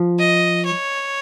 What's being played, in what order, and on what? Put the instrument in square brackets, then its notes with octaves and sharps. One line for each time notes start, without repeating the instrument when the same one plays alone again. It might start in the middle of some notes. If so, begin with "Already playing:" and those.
Already playing: [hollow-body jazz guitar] F3
[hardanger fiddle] D#5
C#5